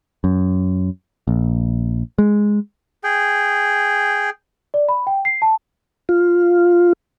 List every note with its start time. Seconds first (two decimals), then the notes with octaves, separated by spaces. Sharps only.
0.24 F#2
1.28 A#1
2.18 G#3
3.04 G#4 G5
4.74 D5
4.89 B5
5.07 G5
5.25 C7
5.42 A5
6.09 F4